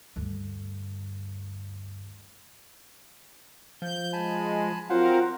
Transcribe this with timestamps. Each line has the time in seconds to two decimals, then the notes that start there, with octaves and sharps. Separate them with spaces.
0.16 D2 G2
3.82 F3 G6
4.13 G#3 G#5 A5 B5
4.90 F#3 C4 F4 A#4 C5 F5 F#5